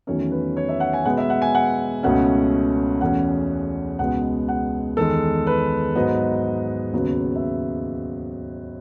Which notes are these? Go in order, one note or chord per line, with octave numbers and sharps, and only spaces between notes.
E2 D#3 F#3 A3 C#4 C#5
B4
C#5
E5
F#5
G#5
B2 G#3 B3 F#5
E5
F#5
G#5
F#5
C#2 B2 A3 C#4 F#5
E2 B2 A3 C#4 F#5
C#2 B2 G#3 B3 F#5
F#5
E2 D#3 G#3 A4
B4
G#2 F#3 B3 D#5
D#2 C#3 F#3 B3
E5